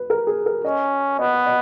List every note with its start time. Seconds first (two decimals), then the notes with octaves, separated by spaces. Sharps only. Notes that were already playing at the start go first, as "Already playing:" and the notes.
Already playing: B4
0.10 A#4
0.27 G#4
0.46 A#4
0.64 C#4 D#5
1.19 B3 D#5
1.46 D#5